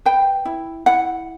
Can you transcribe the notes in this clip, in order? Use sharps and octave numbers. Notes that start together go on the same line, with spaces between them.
B4 G5
E4
E4 F#5